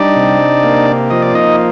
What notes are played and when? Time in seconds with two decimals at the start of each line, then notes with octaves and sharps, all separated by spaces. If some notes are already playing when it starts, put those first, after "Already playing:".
Already playing: G3 D4 D#4 D5
0.16 C3
0.64 A#3
1.10 F3 D#5
1.22 D5
1.35 D#4 D#5